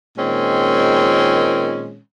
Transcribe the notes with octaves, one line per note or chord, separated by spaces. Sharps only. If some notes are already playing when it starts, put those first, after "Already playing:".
A#2 D#3 G#3 C4 C#4